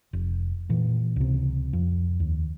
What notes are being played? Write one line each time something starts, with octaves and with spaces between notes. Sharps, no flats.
F1
A#2 E3
C#2 C3
F2
D#2